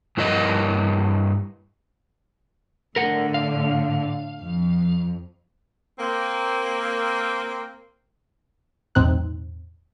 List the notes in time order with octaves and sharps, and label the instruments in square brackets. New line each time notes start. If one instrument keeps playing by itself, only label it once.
[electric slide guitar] G2 E4 A#4 C#5 D#5
[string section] A2 D3 [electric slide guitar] A#4 F#5
[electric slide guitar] F5
[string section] F2
[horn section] A#3 C4
[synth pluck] B1 E2 A2 C4 D#4 F#6